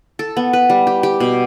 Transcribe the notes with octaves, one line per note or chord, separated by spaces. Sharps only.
A4
B3
B4
G3
G4
G4
B2